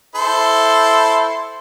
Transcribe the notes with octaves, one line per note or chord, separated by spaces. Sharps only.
E4 A4 C5